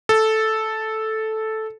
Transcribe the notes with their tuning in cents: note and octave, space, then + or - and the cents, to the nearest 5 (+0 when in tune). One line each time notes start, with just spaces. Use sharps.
A4 -5